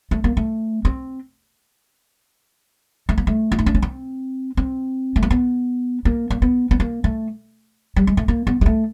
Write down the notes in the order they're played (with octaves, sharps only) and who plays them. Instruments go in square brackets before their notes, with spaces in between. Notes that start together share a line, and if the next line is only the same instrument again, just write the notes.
[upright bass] A3
A#3
A3
C4
A3
A#3
A3
E4
D#4
D4
C#4
C4
C4
A3
A#3
B3
A#3
A#3
B3
B3
A#3
A3
G3
G#3
A3
A#3
B3
G#3
A3